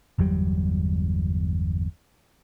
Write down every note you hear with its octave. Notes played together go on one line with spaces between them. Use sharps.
G1 E2 F#3 G3